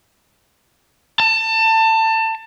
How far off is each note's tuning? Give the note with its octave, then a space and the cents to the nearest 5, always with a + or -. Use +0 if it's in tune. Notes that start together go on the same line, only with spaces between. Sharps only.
A5 +25